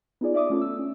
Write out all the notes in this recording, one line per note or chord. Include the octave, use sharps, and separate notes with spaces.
B3 D#4 F4 G#4 D5
D5 E5 D6 D#6
A3 C#4 F4 A4
E6
C#4